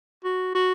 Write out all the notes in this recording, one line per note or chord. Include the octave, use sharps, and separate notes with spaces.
F#4
F#4